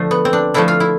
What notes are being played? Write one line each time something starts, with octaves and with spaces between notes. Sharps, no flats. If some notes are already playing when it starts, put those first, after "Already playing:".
Already playing: D3 F3 A3
B3
C4
D4
D3 F3 A3 E4
F4
E4